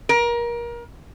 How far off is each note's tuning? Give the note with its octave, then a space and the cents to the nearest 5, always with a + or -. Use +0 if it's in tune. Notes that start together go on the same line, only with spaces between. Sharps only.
A#4 +25